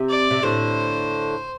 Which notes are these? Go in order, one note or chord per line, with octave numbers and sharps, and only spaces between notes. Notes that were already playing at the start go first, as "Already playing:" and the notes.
Already playing: C3
D5
C3
A2 D3 C5